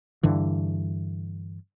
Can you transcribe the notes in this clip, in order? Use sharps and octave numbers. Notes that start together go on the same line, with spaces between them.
G2 D3 E3